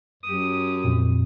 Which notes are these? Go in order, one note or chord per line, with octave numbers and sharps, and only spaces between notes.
F#2 G4 D#6
F2 A#2